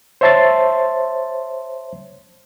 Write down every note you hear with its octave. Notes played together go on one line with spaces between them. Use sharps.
C5 C#5 E5 A5 C6 A6